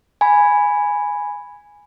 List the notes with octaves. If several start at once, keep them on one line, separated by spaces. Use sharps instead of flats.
G#5 B5